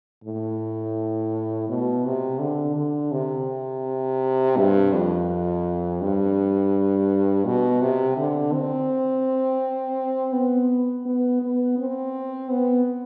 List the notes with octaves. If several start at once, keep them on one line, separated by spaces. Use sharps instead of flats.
A2
B2
C3
D3
D3
C3
G2
F2
G2
B2
C3
D3
C4
B3
B3
B3
C4
B3